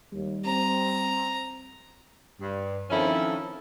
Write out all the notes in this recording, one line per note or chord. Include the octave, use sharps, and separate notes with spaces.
D#2 G3
C4 A#5
G2
D#3 F3 C4 C#4 E4 A4